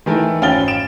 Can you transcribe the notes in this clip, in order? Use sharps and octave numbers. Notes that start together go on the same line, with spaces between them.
D#3 E3 A3
G#1 C#4 F5 G5 A6 G7
D7 E7